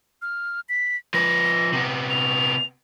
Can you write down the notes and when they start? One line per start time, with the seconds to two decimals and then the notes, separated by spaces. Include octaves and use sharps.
0.22 F6
0.69 B6
1.14 F3 B4 A#6
1.72 C3 B3
2.10 F7